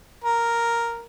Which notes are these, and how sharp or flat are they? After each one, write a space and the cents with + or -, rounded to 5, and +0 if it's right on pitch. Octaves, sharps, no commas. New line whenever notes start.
A#4 +0